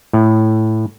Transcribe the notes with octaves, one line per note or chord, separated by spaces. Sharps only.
A2